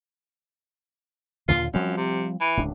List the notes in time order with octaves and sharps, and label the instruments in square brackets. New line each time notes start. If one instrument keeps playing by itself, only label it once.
[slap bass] D#2 A#2 D3 [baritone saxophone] F4
[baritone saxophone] F#2 [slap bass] F3 G3 C4
[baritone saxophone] C3
E3
[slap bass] D1 C#2 D4